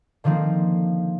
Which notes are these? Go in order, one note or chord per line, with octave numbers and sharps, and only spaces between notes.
D3 D#3 F3 A#3 C4